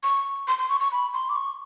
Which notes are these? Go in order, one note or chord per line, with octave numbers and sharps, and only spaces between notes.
C#6
C6
C6
C#6
C#6
B5
C6
D6
C#6